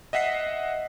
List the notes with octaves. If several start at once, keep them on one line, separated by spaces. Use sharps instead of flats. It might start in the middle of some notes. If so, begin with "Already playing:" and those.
D#5 E5 F#5 B6 C7